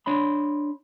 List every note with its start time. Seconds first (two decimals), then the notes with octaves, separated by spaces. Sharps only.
0.06 D4 C#5 B5 C6